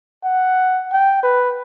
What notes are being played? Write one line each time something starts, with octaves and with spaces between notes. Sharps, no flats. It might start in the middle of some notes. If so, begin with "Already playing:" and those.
F#5
G5
B4